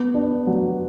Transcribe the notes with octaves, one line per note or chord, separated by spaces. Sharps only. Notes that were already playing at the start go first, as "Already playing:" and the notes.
Already playing: B3
D4
F#3